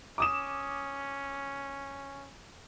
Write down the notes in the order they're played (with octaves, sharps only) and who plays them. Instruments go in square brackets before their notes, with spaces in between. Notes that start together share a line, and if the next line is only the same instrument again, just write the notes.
[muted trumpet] C#4 [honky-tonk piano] D6 D#6 E7